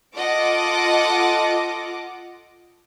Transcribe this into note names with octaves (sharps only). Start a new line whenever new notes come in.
F4 A4 D#5 F#5 D6